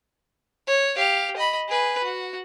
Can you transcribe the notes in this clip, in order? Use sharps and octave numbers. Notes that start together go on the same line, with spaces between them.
C#5
G4 F5
D#5 B5
G#4 B4
F#4